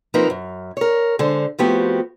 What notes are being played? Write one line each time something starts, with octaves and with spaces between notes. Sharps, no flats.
F3 A#3 C4 D#4 A#4 B4
F#2
A#4 C#5
D3 G#3 C5
F3 A3 B3 C4 F#4 G4